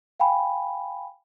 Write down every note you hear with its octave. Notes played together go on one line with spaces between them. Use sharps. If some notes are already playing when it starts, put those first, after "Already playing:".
F5 G5 G#5 B5